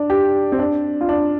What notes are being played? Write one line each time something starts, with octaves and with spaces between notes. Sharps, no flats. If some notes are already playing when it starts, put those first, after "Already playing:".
Already playing: D4
G4
C4
D4
F4
D4